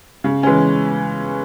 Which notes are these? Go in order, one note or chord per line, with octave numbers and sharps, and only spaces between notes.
C#3
E3 G#3 C#4